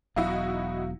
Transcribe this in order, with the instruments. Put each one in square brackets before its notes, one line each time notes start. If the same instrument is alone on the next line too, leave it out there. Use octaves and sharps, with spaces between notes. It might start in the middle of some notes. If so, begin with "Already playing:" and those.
[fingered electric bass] E1 B2 F#3 [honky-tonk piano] D#4 E4 F#4 [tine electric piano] F5